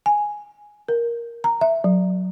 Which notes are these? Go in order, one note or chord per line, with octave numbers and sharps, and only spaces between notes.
G#5
A#4
A#5
E5
F#3